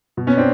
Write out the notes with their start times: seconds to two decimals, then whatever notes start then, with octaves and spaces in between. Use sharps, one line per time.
0.17 B2
0.27 B3 C#4
0.37 C4 D4